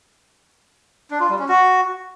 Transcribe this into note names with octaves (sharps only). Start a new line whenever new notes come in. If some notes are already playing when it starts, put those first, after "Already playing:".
D4
F4
G3
C#4
F#4